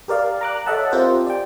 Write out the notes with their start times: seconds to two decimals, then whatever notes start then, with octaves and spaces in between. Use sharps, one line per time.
0.08 G4 A#4 D5 F5
0.41 A#5 D6 F#6
0.66 A4 C#5 D#5 E5 F#5 A5
0.92 C4 F4 G4 A#4 C5
1.26 D5 G5